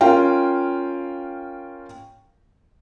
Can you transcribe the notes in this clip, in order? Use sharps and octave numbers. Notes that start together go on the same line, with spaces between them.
C#4 F4 A#4 F5 G5